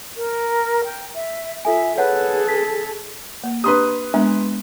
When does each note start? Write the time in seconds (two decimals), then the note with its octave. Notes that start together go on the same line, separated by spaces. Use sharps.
0.17 A#4
0.84 G5
1.14 E5
1.65 F4 A4 E5 G#5
1.98 G#4 A4 B4 C#5 F#5 A5
2.48 B6
3.44 A#3
3.64 D4 G4 B4 C6 D#6
4.14 G#3 B3 D4